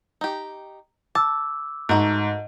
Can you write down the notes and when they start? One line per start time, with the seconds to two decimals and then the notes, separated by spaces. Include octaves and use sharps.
0.21 D#4 G4
1.15 A5 D6 E6
1.89 G#2 A3 F#4 A#4